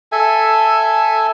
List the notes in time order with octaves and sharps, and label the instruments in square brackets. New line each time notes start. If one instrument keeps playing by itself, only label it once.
[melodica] A4 E5 G#5